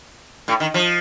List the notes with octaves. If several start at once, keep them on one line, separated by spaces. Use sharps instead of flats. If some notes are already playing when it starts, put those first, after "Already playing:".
A2
D#3
F3